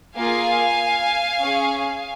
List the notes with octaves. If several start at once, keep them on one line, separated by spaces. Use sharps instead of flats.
A#3 F4 G#4 F5 G#5
C#4 G#4